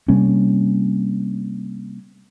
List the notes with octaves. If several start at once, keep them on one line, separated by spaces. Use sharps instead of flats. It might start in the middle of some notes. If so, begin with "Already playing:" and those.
C3 G3 A#3 C#4